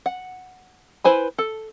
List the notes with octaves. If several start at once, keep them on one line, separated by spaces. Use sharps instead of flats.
F#5
E4 B4 C5 G#5 B5
A4